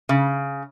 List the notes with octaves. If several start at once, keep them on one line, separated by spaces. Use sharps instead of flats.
C#3